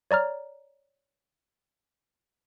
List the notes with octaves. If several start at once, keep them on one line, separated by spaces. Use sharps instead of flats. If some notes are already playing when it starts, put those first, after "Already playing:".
C#5 D5 A#5 F6